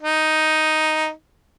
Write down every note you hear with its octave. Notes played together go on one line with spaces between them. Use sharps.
D#4